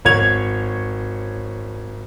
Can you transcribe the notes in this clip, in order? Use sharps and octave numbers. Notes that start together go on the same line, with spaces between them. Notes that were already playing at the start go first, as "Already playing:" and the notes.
G#1 C#5 G#6 F7